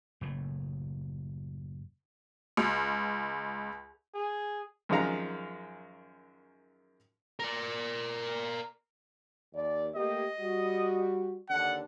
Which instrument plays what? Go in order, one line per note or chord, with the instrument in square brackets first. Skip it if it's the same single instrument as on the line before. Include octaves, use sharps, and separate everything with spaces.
[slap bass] F#1 A2
[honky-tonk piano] C#2
[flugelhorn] G#4
[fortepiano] F#2 D#3 F3 G#3 F5 A#5
[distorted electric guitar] A#4 D5
[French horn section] D#2 D5
[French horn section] A3 A#3 G4 [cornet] D#5
[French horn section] G3 F#4
[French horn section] D#2 D3 D4 [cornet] F#5